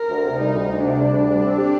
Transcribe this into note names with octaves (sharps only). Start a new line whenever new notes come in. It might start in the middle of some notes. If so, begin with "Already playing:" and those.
Already playing: A#4
D2
C3
G3 D#4
D2
D2
C3 D4
G3
D2
G3
C4
G4